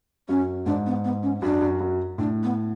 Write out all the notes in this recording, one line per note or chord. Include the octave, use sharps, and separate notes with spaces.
F#2 C#4
G#2 D4
B3
B3
C#4
F#2 D4
F#2
F#2
A2 D4
B3